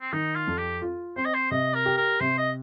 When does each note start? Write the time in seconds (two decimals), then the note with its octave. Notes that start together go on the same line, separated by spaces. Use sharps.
0.02 C4
0.13 D#3 D#4
0.36 F4
0.47 F2
0.58 G4
0.82 F4
1.16 C4 C5
1.26 D#5
1.34 C5
1.51 C3 D#5
1.74 A#4
1.86 G4
1.97 A#4
2.20 C3 C5
2.38 D#5